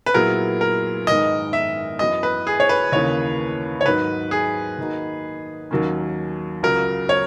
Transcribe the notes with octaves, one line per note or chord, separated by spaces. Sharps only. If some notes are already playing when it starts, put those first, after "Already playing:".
B4
A#2 F#3 B3 E4 G#4 A#4
A#4
G#2 D#3 G#3 B3 D#5
E5
F#2 E3 B3 E4 D#5
B4
G#4
C#5
B4
D#2 C#3 E3 A#3 C#5
C#5
G#2 D#3 F#3 B4
G#4
D#3 A#3 D#4 F#4
D#2 D#3 F#3 A#3 C#4
C#2 C#3 F#3 A#4
C#5